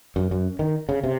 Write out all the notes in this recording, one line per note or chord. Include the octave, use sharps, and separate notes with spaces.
F#2
F#2
D#3
C#3
C3